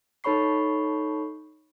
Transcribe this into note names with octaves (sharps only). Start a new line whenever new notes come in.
D#4 A4 C#5 B5 C#6 C7